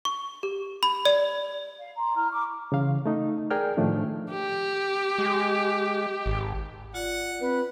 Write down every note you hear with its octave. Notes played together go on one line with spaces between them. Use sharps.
C#6
G4
B5
D5
F5
A#5 C6
E4 A#5 F6
C#6 D6
C#3 E3 F5
A3 D#4
G#4 A#4 D5 G5 G#5 F6
A2 D#3 F3 A3 D4
G4
G#3
G#1
F4 D5 F#5
C4 B4